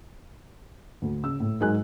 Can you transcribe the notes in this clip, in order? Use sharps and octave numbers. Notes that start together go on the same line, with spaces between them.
D2
C#3 E6
A2
G#2 F#3 G#3 A#4 G#5 F#6